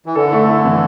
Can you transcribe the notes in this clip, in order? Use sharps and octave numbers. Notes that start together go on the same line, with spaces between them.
E3
D3 A4
A3
E4
E3